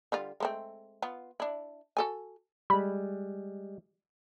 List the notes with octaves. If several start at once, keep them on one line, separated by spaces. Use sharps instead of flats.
D3 G3 F4
G#3 A3 C4
B3 F4
D4 E4
F#4 A4 G#5
G3 G#3 B5